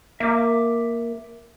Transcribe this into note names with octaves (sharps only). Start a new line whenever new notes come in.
A#3 E5 D6